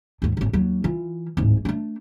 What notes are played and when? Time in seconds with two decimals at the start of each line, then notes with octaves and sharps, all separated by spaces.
0.22 D#2 G#2
0.37 D#1 G#1
0.53 D#2 F#3
0.84 E3 F4
1.37 D1 G#2
1.65 A3 D4